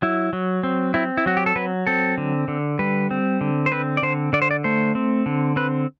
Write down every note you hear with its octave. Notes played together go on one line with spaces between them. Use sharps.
F#3 E4
F#3
C4
C4 E4
E4
F#3 F#4
G4
A4
F#3 B4
C4 A4
D3
D3
G3 B4
C4
D3
C5
C4 B4
D5
D3 C5
D3 D5
C5
D5
A3 C5
C4
D3
C4 B4